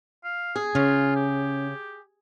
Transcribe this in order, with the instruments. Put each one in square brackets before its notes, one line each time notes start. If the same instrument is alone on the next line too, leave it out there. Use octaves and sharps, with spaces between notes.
[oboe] F5
[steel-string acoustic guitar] G#4
[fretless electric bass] C#3 [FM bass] C#4 [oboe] F4
[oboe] G4